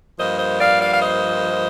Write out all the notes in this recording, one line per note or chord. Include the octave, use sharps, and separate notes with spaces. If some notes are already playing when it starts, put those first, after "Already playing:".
G2 F3 A#3 C5 D#5
C5 D#5
D5 F5
D5 F5
F5
C5 D#5